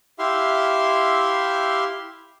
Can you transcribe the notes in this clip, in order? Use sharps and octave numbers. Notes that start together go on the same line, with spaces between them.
E4 G4 E5 F5 C6